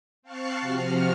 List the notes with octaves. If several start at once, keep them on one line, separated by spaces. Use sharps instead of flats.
C4 F5 A5 C#6 F#6 C7
C3 F3 F#4 F6